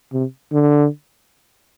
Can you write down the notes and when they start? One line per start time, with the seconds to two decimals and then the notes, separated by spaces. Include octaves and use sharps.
0.13 C3
0.52 D3